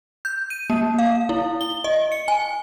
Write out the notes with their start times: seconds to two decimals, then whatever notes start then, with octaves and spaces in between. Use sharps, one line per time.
0.25 G6
0.50 D#7
0.70 A#3
0.99 F5
1.29 E4
1.61 G7
1.84 D#5
2.12 C#7
2.28 G#5